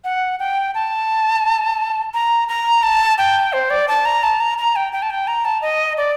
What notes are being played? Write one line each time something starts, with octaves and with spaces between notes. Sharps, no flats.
F#5
G5
A5
A#5
A#5
A5
G5
C5
D5
A5
A#5
A5
A#5
A#5
G5
G5
A5
G5
A#5
A5
D#5
D5